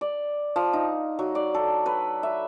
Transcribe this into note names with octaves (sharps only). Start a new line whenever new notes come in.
D5
F3
D#4
F#3
D5
A4
B4
E5